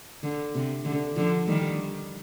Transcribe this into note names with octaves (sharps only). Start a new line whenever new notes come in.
D3
C3
D3
D3 F3
D#3 G3